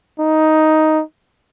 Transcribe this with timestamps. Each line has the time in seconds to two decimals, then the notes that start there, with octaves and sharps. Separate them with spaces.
0.19 D#4